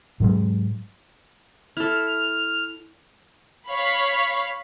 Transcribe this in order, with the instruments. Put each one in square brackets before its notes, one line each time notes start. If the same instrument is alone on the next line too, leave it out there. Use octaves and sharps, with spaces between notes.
[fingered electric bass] G#2 F#3 G#3
[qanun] E4 A4 [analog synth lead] F6
[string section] C#5 F5 B5